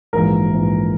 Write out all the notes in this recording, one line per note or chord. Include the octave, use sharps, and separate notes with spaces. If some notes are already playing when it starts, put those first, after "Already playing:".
A#1 G#2 E3 A#4
A#1 G#2 E3